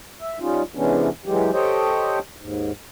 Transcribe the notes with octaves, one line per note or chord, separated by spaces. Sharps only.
E5
G3 C#4 D#4 F4
C3 E3 G#3 B3 C#4 D4
E3 F#3 G#3 G4
G4 A4 C5 C#5 D#5 G5
D#2 G#2